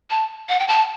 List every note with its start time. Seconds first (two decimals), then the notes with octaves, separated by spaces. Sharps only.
0.11 A5
0.49 F#5
0.59 G5
0.68 A5